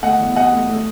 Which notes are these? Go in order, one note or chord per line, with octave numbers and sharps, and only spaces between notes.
A3 D#5 F#5
E2
C3 D#5 F#5
A3
A3